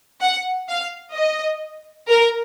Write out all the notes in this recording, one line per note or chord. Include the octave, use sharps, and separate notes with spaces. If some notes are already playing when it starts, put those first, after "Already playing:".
F#5
F5
D#5
A#4